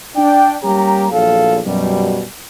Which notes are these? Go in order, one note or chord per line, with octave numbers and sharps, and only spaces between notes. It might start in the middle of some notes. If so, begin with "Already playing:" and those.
D4 G5
G3 A#3 C#4 G4 A#5
A#1 E2 F#3 A4 F5
F#2 B2 G3